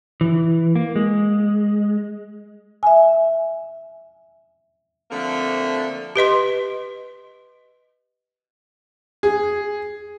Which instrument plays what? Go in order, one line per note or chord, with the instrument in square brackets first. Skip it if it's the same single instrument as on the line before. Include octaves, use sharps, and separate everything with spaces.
[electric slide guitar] E3
A#3
G#3
[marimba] E5 G#5
[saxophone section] D3 F3 A3 A#3 C4
[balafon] G4 B4 D#5 C6
[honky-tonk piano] G#4